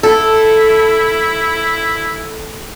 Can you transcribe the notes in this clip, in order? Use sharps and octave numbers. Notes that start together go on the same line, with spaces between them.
E4 A4